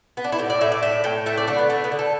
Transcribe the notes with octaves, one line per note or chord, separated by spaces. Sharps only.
B3
D4
E4
A2 G4
D5
A2 E5
D5
A2 E5
A2 G5
A3 E5
D5
D3 D4
B3
D3 A3
B3
D3
A4